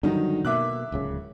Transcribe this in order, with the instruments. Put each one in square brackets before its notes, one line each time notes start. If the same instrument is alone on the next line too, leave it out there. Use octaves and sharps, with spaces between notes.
[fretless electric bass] G2 D3 [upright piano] D#3 F#3 D#4
[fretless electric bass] B2 A#3 [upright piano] E5 D6 F#6
[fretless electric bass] D1 C#2 C#3